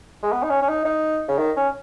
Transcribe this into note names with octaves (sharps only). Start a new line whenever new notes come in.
G#3
B3
D#4
C#4
C#4
D#4
D#4
C#3
D#3
C#4